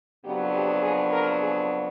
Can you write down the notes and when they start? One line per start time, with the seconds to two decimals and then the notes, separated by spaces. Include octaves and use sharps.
0.24 F2 C#3 F#3 B3 D4 G4
0.54 G4
0.83 G#4
1.12 A#4
1.40 G#4